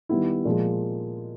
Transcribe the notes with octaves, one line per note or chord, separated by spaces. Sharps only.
D#3 G3 B3 E4
A#2 F3 G#3